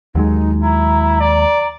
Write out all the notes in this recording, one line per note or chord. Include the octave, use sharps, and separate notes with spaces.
D#2 F#3 G#3 D#4
E4 A#5
D5